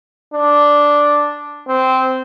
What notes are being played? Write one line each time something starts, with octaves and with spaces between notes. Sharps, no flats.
D4
C4